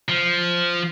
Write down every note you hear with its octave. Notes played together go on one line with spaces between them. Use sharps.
F3